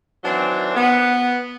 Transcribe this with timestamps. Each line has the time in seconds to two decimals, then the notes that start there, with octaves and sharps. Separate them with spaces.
0.24 D#3 E3 F#3 C4 D4
0.74 B3